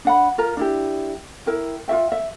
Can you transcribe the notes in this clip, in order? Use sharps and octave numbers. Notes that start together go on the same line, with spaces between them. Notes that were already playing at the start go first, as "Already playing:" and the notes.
D4 F#5 B5
F4 A#4 A#5
D4 E4 G4
E4 A#4 G5
F4 F#4 E5 G5
E5